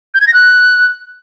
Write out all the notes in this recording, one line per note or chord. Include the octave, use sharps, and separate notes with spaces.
G6
G#6
A#6
F#6